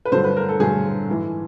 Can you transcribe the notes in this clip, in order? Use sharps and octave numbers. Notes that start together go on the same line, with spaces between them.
B4
G2 D3 F#3 C5
B4
A#4
A4
G2 D3 F#3 G#4
G#2 E3